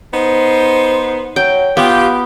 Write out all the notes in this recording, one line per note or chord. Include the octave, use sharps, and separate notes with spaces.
B3 D#4 C5
F#3 G5
B3 F4 G4